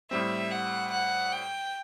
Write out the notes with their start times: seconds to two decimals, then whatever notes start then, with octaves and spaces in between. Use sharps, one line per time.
0.11 A2 G3 C4 E5
0.51 F#5
0.91 F#5
1.32 G5